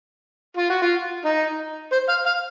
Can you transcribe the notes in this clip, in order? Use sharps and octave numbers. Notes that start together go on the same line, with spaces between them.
F4
F#4
F4
D#4
C5
F5
F5